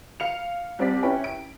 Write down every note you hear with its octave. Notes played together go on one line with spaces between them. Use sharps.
F5 C#7 F7
C2 C4 D5 B6
C#4 E4 B4 C#5 G5
D7